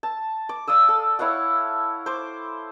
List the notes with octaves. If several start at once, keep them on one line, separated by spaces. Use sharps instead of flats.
A5
D6
D5 F5 D#6 E6
A4
E4 C#5 F5 F#5
C5 D6